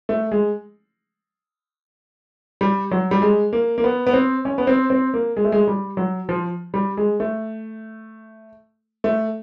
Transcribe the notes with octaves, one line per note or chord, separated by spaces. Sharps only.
A3
G#3
G3
F#3
G3
G#3
A#3
A#3
B3
B3
C4
C#4
B3
C4
C4
A#3
G#3
A3
G#3
G3
F#3
F3
G3
G#3
A3
A3